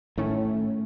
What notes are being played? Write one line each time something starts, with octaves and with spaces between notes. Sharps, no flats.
A2 D#3 A3 C#4